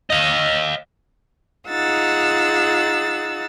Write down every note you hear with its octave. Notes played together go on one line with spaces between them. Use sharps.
D#5 F5
D#4 F4 G#4 F#5 E6 A6